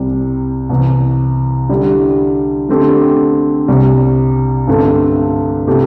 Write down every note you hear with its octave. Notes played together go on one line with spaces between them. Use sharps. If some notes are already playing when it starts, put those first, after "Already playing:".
Already playing: C2 C3 G3
C2 C3 E3
D3 G3 E4 G4
D3 A3 C4 G4
C2 C3 G3
G2 D3 A3 C4
C3 A3 E4 G4